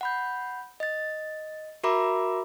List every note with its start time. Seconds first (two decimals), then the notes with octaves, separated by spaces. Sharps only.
0.01 F#5 B5 G6
0.80 D#5 A6
1.84 F#4 A#4 E5 A#5 B5 D6